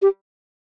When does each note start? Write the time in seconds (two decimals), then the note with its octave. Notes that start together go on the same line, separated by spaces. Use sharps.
0.02 G4